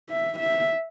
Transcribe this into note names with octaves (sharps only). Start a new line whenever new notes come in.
E5
E5